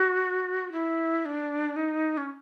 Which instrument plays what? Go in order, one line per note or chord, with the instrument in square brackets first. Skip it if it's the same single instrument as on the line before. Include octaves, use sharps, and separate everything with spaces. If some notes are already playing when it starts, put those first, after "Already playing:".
Already playing: [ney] F#4
E4
D4
D#4
C#4